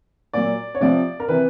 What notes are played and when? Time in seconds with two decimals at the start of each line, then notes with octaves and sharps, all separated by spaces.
0.33 A#2 F#3 D5
0.75 C#5
0.81 C3 F3 D5
1.20 A#4
1.28 C3 E3 B4